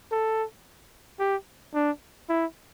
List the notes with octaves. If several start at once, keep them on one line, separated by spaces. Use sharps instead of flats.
A4
G4
D4
E4